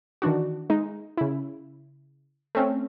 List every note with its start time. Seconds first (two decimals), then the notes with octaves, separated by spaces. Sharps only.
0.22 D#3 E3 D4 F#4
0.70 G#3 D#4
1.17 C#3 E4
2.55 A3 C4 C#4